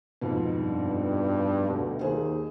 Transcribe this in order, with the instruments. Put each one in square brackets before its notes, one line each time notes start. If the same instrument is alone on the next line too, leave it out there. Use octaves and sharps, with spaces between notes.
[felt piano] F2 G#2 B2
[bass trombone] G2
[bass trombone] D2 [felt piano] B2
[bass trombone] D#2 [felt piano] G#4 C5